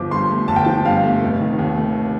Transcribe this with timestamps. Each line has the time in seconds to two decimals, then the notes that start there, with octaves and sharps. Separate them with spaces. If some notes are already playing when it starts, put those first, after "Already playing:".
Already playing: G1 F3 D6
0.11 G2 C6
0.30 A3
0.48 G1 A5
0.56 G5
0.65 F3 A5
0.85 G2 F5
1.04 A3
1.23 F1
1.40 D#3
1.59 D#2
1.77 A3